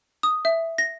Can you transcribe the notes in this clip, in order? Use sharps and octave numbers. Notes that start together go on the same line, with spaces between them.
D#6
E5
A#6